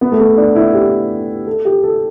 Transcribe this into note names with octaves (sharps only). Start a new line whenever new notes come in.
B3
A3
B3
D4
E4
G4
A4
G4
A4